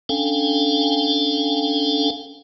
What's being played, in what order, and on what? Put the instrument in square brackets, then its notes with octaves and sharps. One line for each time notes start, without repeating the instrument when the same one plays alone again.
[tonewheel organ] C#4 D4 A4 F5 G5 G#5